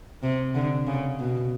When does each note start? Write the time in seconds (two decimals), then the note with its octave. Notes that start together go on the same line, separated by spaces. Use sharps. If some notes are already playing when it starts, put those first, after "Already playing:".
0.23 C3
0.55 D3
0.87 C#3
1.19 B2